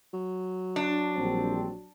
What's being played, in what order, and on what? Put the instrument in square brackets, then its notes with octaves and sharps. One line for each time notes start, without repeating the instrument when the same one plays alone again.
[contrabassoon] F#3
[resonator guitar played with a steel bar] D4
[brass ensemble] A#1 G3 C4